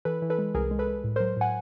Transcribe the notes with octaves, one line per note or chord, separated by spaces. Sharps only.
E3 A4 B4
E3
A4 B4
G#3
C2 G#4 A#4
G#3
A4 B4
G#3
A2
A#4 C5
F#3
A2 F#5 G#5